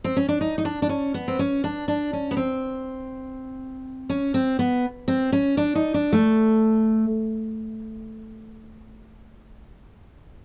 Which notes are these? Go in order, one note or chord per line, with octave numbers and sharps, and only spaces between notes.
C4
C#4
D4
D#4
D#4
D4
D4
C#4
B3
C4
C#4
D4
D4
C#4
B3
C4
C#4
C4
B3
C4
C#4
D4
D#4
D4
A3